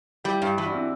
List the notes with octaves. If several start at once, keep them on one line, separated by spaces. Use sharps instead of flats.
G3 E4 G4
G2
E3 E4 G4
D4 F#4
C4 E4